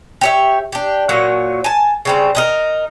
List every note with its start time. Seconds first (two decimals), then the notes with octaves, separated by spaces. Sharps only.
0.21 G4 C#5 E5
0.72 D4 G4
1.09 A#2 F#3 C#5 F#5
1.64 G#5 A5
2.05 C#3 G3 C4
2.35 D4 D#4 A#4